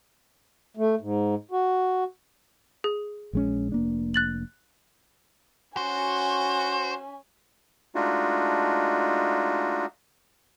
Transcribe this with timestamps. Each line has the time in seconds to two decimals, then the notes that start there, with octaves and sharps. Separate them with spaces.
0.77 A3
1.01 G#2
1.51 F#4
2.84 G#4
3.33 A#1 G#3 C#4
3.72 F1 A#3 D4
4.14 F#6 A6 F#7
5.77 C#4 F#4 C5 G#5
7.95 G#3 A3 D4 D#4 F4 F#4